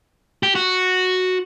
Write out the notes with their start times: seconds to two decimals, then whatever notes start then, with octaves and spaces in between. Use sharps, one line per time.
0.43 G4
0.55 F#4